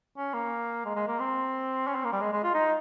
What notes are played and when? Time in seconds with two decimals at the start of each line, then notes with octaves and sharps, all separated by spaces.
0.18 C#4
0.34 A#3
0.85 G#3
0.96 G#3
1.08 A#3
1.20 C4
1.88 C#4
1.95 C4
2.04 A#3
2.13 G3
2.21 G#3
2.33 G#3
2.43 F4
2.54 D#4